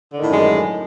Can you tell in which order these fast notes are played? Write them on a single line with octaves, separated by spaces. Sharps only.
D3 D#3 A2 F#2 G#3